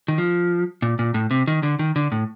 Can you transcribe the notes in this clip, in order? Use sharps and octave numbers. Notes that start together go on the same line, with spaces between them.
D#3
F3
A#2
A#2
A2
C3
D#3
D3
D#3
D3
A2